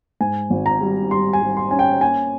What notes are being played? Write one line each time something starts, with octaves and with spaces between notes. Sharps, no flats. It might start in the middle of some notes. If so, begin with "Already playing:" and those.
G#2 G#5
G#1
A#5
G3
G3 C6
G#5
G3
C6
C#4 G#5
G5
A#3 G#5